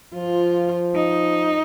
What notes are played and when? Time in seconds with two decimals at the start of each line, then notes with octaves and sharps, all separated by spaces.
0.15 F3 F4
0.95 D#4